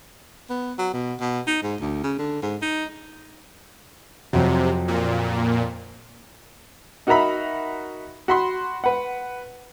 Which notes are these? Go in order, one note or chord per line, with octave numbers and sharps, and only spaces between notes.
B3
F#3
B2
B2
D#4
G#2
D2
C#3
D3
G#2
D#4
F2 C3 F#3
A#2
D#4 F#4 A#4 E5 A#5 B5
F#4 B5 C6
B4 F#5